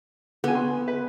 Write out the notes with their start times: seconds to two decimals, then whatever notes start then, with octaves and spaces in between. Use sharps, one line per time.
0.44 D3 B3 G#5
0.55 C6
0.88 B4